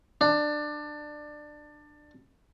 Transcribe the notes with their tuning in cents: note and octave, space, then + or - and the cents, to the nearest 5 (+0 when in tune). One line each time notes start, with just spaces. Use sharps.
D4 +20